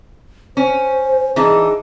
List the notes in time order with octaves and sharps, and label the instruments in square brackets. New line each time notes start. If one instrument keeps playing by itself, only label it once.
[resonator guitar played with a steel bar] C#4 [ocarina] C5
[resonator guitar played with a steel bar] E3 D4 D#4 [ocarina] G#4